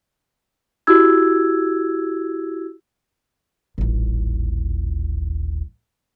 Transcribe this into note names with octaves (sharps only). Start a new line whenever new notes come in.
E4 F#4 G4 E6 G#6
D#1 A1